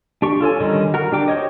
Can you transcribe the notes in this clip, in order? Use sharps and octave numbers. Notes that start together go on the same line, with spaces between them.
D4 G4 C#6
F4 A4 C#5 G#5
D3 D#3 G3 C#4 D#4
F#4 A#4
D4 G4 G5 D6
F#4 C5 C#5 D#5